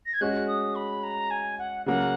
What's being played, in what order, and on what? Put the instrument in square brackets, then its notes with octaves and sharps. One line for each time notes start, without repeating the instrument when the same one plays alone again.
[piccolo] A#6
G#6
[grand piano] G#3 C#4 F#4 [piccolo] F#6
[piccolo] D#6
B5
A#5
G#5
F#5
[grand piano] C#3 F#3 A#3 [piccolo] F#5